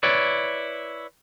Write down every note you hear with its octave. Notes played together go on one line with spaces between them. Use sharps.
E4 B4 C#5 D5